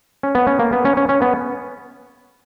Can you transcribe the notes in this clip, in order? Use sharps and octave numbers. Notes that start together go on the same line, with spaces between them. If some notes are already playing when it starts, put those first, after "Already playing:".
C#4
B3
C#4
A#3
B3
C#4
C#4
C#4
B3